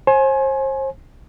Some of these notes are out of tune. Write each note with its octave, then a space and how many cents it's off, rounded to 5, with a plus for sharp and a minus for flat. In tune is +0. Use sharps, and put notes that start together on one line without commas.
C5 +40 G#5 +20